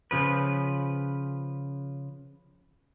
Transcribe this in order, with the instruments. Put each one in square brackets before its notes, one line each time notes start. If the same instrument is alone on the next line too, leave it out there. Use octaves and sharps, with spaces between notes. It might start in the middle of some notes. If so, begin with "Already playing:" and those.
[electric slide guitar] C#3 F3 B4